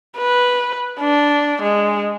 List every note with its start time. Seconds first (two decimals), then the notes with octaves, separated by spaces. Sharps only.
0.17 B4
1.00 D4
1.62 G#3